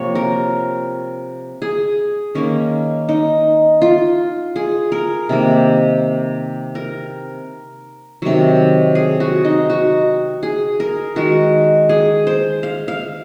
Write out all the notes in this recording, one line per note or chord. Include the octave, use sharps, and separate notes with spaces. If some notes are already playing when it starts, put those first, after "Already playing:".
Already playing: C3 F3 A#3 C#5
A#4
G#4
D#3 A#3 C#4
D#4
F4
G#4
A#4
C3 D#3 A#3
A#4
C3 D#3 F#3
G#4
F#4
D#4
F#4
G#4
A#4
D#3 G#3 F#4
G#4
C5
F5
F5